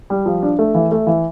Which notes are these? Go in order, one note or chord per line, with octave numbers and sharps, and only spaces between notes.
G3
F3
D4
A3
E3
A3
E3